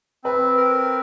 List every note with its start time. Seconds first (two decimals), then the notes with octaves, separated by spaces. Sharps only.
0.24 C4 B4
0.57 A#4